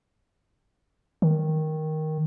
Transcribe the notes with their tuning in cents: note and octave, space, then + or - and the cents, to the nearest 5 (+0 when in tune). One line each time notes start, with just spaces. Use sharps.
D#3 +5